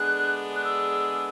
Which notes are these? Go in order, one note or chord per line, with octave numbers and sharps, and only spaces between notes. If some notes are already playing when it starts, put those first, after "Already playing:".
Already playing: D3 G#3 B3 D4 G#4 F#6
F#6
E6